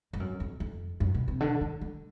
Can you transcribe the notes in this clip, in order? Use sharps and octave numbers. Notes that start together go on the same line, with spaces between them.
G2
F#2
F2
F2
F#2
B2
C3
D3
D#3
D3